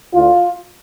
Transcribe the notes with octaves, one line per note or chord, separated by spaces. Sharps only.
D2 D3 F4